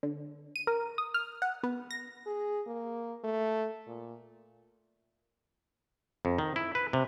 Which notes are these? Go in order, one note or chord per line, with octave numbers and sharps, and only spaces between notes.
D3
D#7
A#4
D#6
F6
F#5
B3
A#6
G#4
A#3
A3
A#2
F2
D#3
E4
B4
C3